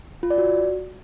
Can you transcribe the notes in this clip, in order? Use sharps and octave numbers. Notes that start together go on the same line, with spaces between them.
F4
D5
F#4